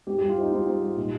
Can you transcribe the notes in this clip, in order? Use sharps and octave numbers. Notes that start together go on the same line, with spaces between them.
G#2 G4
G4
G3
F4
C4 D#4
G#2 F4
G#2
G3
A#2 D#4